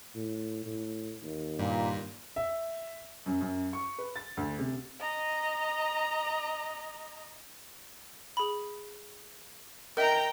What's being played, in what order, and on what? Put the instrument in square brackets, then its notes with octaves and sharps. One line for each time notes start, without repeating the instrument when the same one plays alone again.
[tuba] A2
A2
D#2
[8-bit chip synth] G2 [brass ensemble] A#2
[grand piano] E5
[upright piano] F#2
F#2
C#6
B4
A6
D2
C3
[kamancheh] D#5 A#5
[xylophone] G#4 B5
[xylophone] A#4 D#5 E5 [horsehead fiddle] G5 A#5